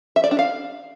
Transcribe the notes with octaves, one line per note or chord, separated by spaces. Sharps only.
E5
D5
D4
F5